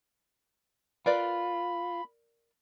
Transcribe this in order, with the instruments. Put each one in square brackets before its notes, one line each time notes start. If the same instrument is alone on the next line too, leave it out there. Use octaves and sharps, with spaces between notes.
[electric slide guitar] F4 [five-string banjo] A#4 B4 D5 [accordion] B5